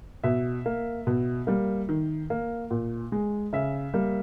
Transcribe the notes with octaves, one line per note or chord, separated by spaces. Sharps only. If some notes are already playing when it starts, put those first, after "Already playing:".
B2 E5
A#3
B2
G3 A#3
D#3
A#3
A#2
G#3
C#3 E5
G3 A#3